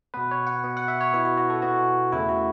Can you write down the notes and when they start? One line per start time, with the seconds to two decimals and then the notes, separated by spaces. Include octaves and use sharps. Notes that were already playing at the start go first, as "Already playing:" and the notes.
0.14 B2 B3 B4
0.31 C#5
0.47 F#5
0.64 B2 B3
0.77 F#5
0.88 E5
1.01 C#5
1.13 B2 B3 E4
1.25 F#4
1.38 F#4
1.50 A4
1.62 B2 B3 F#4
2.12 E2 C#3 E3 A3 E4
2.29 F#4